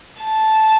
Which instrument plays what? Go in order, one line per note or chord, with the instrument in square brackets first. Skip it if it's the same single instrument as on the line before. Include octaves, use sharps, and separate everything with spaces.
[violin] A5